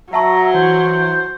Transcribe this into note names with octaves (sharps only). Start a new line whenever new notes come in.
F#3 E5 F#5 A5 A#5 C#6
E3 C5